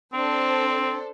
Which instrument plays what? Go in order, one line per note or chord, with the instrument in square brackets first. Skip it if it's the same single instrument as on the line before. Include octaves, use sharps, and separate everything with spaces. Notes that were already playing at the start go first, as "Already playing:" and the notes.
[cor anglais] C4 [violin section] D4 A4 C5